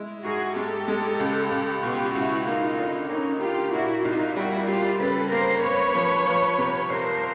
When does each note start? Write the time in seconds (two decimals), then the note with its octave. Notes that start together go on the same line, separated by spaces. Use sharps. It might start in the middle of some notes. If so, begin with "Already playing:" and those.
Already playing: G#3 E4
0.24 G#2 F#4 G#4
0.56 G#3 G4 A4
0.88 G#3
1.20 C#2
1.51 C#2
1.83 B2 F4 G4
2.15 C#2 E4 F#4
2.46 A#3 D#4 F4
2.78 D3
3.09 A#3 C#4 D#4
3.41 A#3 F4 G4
3.73 A#2 E4 F#4
4.04 C2 D#4 F4
4.37 G3 E4 F#4
4.68 G3 F4 G4
5.00 C#3 A4 B4
5.32 A#3 A#4 C5
5.63 A#3 B4 C#5
5.95 F3
6.27 F3
6.58 C3
6.90 C2 A#4 C5